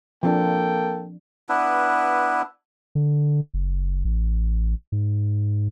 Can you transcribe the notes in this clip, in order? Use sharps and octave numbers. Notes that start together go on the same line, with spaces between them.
F3 A#3 C4 D4 A4 G5
B3 D4 E4 B4
D3
F#1
A1
G#2